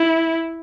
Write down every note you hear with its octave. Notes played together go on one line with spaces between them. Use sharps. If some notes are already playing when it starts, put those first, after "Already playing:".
Already playing: E4